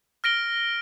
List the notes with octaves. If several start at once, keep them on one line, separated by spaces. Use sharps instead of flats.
F6 A#6 D7 G7